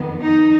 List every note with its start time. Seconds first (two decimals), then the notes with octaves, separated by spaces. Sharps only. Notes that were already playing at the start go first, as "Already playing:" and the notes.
Already playing: F2 D#3 B3
0.22 D#4